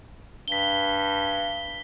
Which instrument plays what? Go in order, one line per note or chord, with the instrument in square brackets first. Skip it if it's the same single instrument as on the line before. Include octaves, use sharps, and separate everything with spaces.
[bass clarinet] G2 [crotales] B6 G7